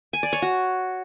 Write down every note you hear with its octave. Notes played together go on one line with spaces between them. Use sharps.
G#5
D5
C#5
F#4